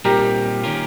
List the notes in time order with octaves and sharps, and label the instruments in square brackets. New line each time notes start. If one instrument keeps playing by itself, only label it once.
[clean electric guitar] A#2 G3 C4 D#4 [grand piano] G4 A#4
[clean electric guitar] D#3 A#3 C#4 F4 A#4